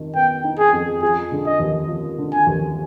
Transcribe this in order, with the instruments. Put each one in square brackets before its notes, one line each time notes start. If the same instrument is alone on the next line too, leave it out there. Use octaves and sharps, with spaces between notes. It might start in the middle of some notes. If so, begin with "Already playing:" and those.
Already playing: [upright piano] F2 D#3
[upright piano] B3 [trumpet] G5
[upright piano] D#4
[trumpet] G#4
[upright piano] F2
[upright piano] F3 [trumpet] G#4
[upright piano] D3
[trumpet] D#5
[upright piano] D#2
F3
D3
[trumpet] G#5
[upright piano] D#2